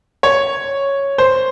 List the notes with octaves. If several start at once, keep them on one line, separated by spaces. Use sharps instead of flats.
C#5
C5